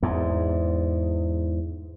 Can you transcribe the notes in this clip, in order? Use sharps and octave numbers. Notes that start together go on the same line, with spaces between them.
E2 G#2